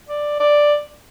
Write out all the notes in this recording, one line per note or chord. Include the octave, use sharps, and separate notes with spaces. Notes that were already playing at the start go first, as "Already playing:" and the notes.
D5
D5